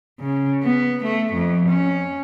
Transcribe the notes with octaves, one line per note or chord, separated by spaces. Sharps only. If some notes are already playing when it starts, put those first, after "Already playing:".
C#3
B3
A3
F2
C#4